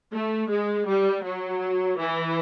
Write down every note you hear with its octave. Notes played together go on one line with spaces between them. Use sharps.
A3
G#3
G3
F#3
E3